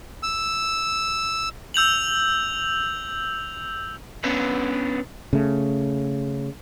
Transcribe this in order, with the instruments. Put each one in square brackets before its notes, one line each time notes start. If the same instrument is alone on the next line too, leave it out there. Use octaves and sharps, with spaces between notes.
[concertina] E6
[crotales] E6 G6 F7 F#7
[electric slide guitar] B3 C#4 D4 B4
[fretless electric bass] C#3 A3